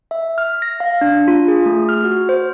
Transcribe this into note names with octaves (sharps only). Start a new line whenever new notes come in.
E5
F6
A#6
F5
D4
F4
G#4
A3
F6
F#4
C5